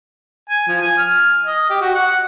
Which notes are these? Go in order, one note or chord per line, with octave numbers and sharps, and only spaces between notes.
G#5
F3
G#5
F6
D#5
G4
F#4
F#5